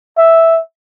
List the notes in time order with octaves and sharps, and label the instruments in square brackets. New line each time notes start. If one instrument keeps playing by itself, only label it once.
[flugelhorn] E5